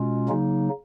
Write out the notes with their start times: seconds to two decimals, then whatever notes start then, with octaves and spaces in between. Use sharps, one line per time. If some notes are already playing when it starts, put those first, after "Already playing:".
Already playing: B2 G#3 C#4 F4
0.29 C#3 F#3 A#3 D#4